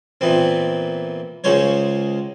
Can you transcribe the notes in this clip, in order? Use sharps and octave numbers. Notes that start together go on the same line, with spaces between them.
A#2 E3 B3 C4
C#2 C#3 G#3 C#4 C5 C#5